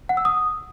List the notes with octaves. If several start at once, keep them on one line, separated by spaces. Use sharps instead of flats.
F#5
E6
D#6